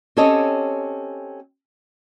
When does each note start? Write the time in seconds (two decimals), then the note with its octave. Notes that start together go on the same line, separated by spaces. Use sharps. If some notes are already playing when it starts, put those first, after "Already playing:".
0.17 C4 C#4 G4 A4 C#5 D#5